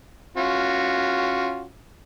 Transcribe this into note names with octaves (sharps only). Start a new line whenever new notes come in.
C#4 F4 F#4